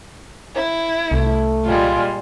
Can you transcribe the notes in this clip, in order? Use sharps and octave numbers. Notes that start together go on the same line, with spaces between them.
E4
C2 A3
A#2 G3 G#3 F4